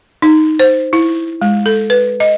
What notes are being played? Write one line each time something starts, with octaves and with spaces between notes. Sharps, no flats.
D#4
C5
E4
G#3
A4
B4
D#5